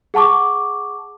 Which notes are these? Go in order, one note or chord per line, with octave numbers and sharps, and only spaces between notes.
G#4 F#5 A5 C#6 D6